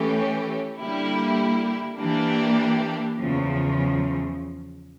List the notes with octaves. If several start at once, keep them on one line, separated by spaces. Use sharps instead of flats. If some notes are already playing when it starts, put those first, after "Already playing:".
Already playing: E3 A3 C#4 G4
D3 G3 A#3 E4 G4
E3 A#3 D4 G4
E2 C#3 F3